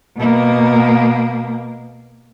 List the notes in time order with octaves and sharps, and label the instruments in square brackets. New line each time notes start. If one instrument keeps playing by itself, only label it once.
[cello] B2 A#3